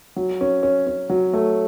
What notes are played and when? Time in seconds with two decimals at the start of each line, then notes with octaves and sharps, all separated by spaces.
0.16 F#3
0.41 C#4
0.63 C#4
0.87 C#4
1.10 F#3
1.34 A3